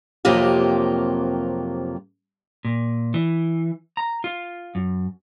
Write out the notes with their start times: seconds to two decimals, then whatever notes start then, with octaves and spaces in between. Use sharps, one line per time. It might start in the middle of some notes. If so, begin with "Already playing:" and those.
0.25 F2 C3 F#3 A#3 F4 G4
2.65 A#2
3.14 E3
3.97 A#5
4.24 F4
4.75 F#2